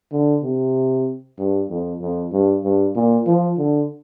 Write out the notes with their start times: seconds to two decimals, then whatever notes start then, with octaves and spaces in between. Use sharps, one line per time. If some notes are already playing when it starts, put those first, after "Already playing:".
0.12 D3
0.43 C3
1.38 G2
1.69 F2
2.02 F2
2.33 G2
2.64 G2
2.95 A#2
3.26 F3
3.58 D3